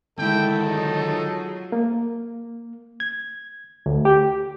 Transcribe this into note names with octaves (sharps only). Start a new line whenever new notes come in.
D3 D#3 G#3 E4 A4 G5
F#3 D#4 F4 G#4
A#3
G#6
D2
G4